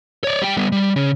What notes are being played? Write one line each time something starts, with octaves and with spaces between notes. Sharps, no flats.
C#5 D5
G3 G5
G3 B3
G3
C#3